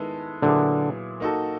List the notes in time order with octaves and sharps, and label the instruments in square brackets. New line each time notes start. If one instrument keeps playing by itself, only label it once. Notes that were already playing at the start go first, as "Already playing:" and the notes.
Already playing: [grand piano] D#3 G#3 B3 E4 A4
[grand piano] A#2 F#3 B3 E4 G#4 [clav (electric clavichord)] D3
[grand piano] A#3 D#4 F#4 A4